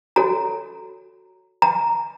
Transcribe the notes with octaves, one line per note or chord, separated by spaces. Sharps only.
F#4 A4 C#5 A#5
A#5